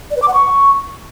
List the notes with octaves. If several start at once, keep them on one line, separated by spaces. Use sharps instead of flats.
D5
B4
D6
F#5
C#6